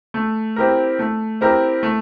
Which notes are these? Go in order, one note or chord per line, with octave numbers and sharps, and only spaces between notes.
A3
C4 E4 G4 A#4
A3
C4 E4 G4 A#4
A3